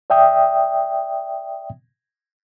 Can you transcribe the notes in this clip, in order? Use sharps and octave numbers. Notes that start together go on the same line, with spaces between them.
D5 E5 G5 D#6